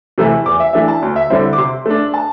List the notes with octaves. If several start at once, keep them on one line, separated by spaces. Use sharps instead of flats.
C3 E3 A3 E4
E2 D6
E5
E3 A3 D4 E5
A5
D2
E5
D3 G3 C4 E4 E5
D6
C3 C6
A3 D4
A5